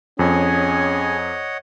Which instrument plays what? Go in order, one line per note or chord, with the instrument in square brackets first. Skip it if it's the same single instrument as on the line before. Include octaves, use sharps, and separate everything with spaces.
[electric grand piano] F2 [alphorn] C#4 [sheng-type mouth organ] G#4 G#5 [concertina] C#5 D#5 F#5